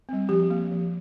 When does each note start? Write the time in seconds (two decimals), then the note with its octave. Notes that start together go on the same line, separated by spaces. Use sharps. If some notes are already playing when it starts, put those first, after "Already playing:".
0.09 G3 C4
0.29 F3 G4
0.50 A#3
0.71 F3